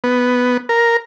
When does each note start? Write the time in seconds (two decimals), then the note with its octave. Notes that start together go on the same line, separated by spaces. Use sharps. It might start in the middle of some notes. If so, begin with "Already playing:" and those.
0.04 B3
0.69 A#4